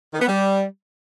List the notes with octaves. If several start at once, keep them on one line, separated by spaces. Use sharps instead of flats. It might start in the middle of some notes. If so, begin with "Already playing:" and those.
D#3
B3
G3